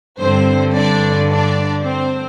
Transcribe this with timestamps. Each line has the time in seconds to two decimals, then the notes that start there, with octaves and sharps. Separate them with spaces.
0.21 G2 D3 C4 C5
0.75 D4 D5
1.31 D4 D5
1.84 C4 C5